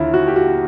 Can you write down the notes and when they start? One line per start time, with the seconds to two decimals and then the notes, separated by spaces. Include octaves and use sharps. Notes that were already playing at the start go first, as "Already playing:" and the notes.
Already playing: D#2 D3 E4 F4
0.14 F#4
0.27 G4
0.36 F#4